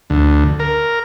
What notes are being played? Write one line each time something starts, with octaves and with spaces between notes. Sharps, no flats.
D2
A#4